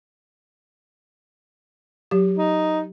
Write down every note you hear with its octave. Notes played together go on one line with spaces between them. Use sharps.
F#3 G4
D#4